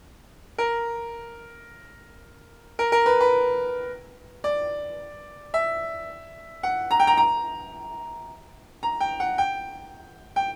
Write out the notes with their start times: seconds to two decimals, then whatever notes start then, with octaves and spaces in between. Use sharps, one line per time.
0.58 A#4
2.79 A#4
2.92 A#4
3.06 B4
3.20 B4
4.44 D5
5.54 E5
6.63 F#5
6.91 A#5
7.00 G5
7.07 A#5
7.17 A#5
8.83 A#5
9.00 G5
9.20 F#5
9.38 G5
10.36 G5